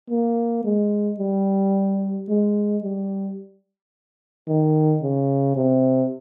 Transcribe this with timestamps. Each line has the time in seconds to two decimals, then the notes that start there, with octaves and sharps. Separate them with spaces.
0.10 A#3
0.65 G#3
1.20 G3
2.29 G#3
2.83 G3
4.48 D#3
5.02 C#3
5.56 C3